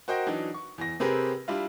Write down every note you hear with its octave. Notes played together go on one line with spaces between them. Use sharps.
F#4 A#4 C5 D#5 G5
E3 F#3 D4 D#4
C#6
E2 A#6
C3 C4 G4 G#4 A#4 B4
G3 D4 E4 F4